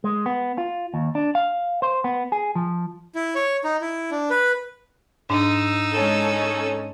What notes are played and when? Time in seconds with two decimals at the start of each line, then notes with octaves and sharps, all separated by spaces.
0.04 G#3
0.26 B3
0.58 F4
0.94 D#2
1.15 D4
1.35 F5
1.82 C5
2.04 B3
2.32 G#4
2.55 F3
3.15 E4
3.35 C#5
3.64 D#4
3.81 E4
4.11 D4
4.30 B4
5.30 G#2 D4 D#4 E6
5.92 G#3 C#4 A4